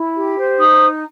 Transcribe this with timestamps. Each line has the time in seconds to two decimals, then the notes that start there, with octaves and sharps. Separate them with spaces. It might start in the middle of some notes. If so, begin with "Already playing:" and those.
Already playing: E4
0.14 G4
0.36 C5
0.58 D#4 D#6